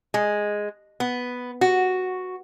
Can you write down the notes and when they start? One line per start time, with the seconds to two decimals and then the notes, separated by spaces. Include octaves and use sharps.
0.14 G#3
1.00 B3
1.61 F#4